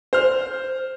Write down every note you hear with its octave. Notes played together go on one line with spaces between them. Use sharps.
C5 F6